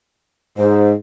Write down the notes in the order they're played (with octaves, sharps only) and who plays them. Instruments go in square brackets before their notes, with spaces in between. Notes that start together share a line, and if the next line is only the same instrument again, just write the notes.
[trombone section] G#2 [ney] C5